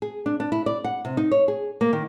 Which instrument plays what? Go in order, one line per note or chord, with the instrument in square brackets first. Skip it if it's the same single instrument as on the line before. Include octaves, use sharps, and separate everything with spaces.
[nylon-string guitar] G#4
D4
D4
E4
D5
F#5
C3
D#4
C#5
G#4
A#3
D#3